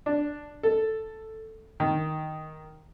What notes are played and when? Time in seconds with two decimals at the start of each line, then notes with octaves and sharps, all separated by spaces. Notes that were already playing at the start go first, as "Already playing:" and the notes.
0.06 D4
0.63 A4
1.80 D#3